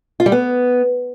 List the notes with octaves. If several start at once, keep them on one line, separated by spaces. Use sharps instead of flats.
F4
G3
B3